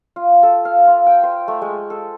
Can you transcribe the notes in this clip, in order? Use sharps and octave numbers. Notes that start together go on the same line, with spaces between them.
F4
A4
F5
F4
G5
C5
A3
G#3
A4